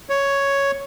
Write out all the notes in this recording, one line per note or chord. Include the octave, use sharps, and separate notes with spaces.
C#5